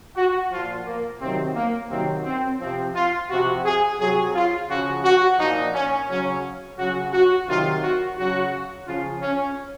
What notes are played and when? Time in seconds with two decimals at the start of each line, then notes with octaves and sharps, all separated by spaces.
0.16 F#4
0.52 A#2 F3 F4
0.86 A#3
1.21 C3 D#3 F#3 C4
1.56 A#3
1.90 C3 D#3 F#3 C4
2.25 C4
2.60 C3 F3 C4
2.95 F4
3.30 C3 F3 F#4
3.65 G#4
4.00 C3 F#3 G#4
4.35 F4
4.69 C#3 F3 F#4
5.05 F#4
5.39 A#2 F3 D#4
5.74 C#4
6.09 C#3 F#3 C#4
6.79 C#3 F#3 F#4
7.13 F#4
7.48 C3 D#3 F#3 F4
7.83 F#4
8.18 C#3 F#3 F#4
8.88 C#3 F3 F4
9.23 C#4